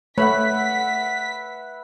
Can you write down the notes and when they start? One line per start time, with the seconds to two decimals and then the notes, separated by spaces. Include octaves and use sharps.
0.18 A3 B4 C#5 E5 F#5 B5 B6